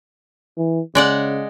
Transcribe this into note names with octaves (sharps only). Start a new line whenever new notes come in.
E3
C#3 G#3 D5 F#5